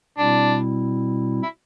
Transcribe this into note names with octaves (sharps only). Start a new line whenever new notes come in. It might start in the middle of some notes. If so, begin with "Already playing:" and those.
B2 G3 C4 D4 E4
E4